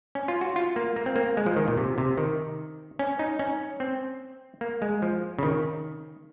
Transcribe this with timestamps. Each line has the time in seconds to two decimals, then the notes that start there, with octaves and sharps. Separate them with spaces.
0.15 C#4
0.28 F4
0.41 F#4
0.56 F4
0.76 A#3
0.96 A#3
1.06 C4
1.16 A#3
1.37 G#3
1.46 F3
1.57 D#3
1.68 A#2
1.78 C3
1.98 C3
2.18 D#3
2.99 C#4
3.19 D#4
3.39 C#4
3.80 C4
4.61 A#3
4.82 G#3
5.02 F3
5.39 C#3
5.43 D#3